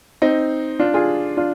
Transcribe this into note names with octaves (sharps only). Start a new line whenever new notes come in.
C4 D#4
D4 F4
F4 G#4
D4 F4